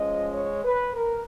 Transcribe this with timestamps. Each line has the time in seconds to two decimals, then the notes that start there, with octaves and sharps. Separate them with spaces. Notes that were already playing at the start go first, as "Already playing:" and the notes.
Already playing: F3 G#3 C#4 D#5
0.34 C#5
0.65 B4
0.94 A#4